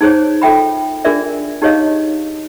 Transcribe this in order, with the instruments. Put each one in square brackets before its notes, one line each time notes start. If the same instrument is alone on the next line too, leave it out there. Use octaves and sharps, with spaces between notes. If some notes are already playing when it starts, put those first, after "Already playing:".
[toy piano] D#4 G#4 C5 C#5
F4 A4 E5 G5 B5
D4 F4 G#4 A#4 D5 E5
D#4 G4 G#4 C#5 D#5 F5